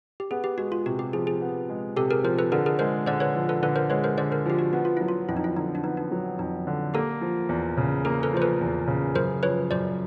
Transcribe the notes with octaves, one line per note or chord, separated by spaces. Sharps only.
G4
B3 G#4
G4
G#3 F#4
F4
C3 F#4
G4
F3 G#4
G#4
B3
G#3
C3 G4 A4
G#4 A#4
F3 A#4 C5
A4 B4
D3 G#4 A#4
G#4 A#4
G#3 A#4 C5
D3 C5 D5
B4 C#5
F3
A4 B4
D3 A4 B4
A#4 C5
G#3 B4 C#5
A#4 C5
D3 C5 D5
A#4 C5
F3 G4
F#4
B3 F#4
F4
F#3 E4
F4
F2 E4
D#4
E4
D3 D#4
D4
B3 D#4
D4
F#3
F2 D#4
D3
A#3 G4 A4
F3
E2
C#3
A#3 G#4 A#4
A4 B4
F3 C5
A4 B4
E2
C#3
F#2 A#4 C5
F3 B4 C#5
F#2 C5 D5